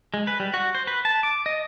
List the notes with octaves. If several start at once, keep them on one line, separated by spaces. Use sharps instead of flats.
G#3
B4
G3
F#4
C5
B4
A5
D6
D#5